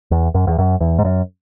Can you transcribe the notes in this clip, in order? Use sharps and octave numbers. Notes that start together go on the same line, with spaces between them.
E2
F#2
E2
F#2
E2
G#2
F#2